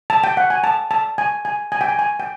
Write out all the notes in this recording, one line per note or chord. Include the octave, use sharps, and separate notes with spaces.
A5
G5
F#5
G#5
A5
A5
G#5
G#5
G#5
G5
G#5
G#5
G5